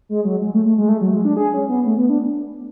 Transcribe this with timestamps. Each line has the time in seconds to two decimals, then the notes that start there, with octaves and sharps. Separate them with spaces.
0.09 G#3
0.25 F#3
0.42 G#3
0.54 A3
0.66 A3
0.78 G#3
0.89 A3
1.01 F#3
1.13 G#3
1.25 D4
1.37 G#4
1.54 C#4
1.69 B3
1.85 A3
1.97 B3
2.09 D4